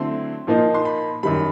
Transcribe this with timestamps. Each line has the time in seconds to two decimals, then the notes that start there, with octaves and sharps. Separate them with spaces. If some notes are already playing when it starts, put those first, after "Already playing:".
Already playing: D3 F#3 A3 C4 E4 C6
0.47 A#2 F3 A#3 D#4
0.74 C6
0.85 B5
1.23 F#2 D#3 G3 B5